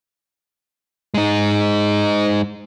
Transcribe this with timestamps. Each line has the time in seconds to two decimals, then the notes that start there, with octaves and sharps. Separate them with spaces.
1.14 G#3 D#4